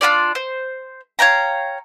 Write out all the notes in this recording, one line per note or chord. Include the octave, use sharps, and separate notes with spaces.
D4 F4 G4 D5
C5
C#5 F5 G5 A#5